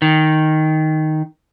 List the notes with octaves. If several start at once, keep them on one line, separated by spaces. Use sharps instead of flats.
D#3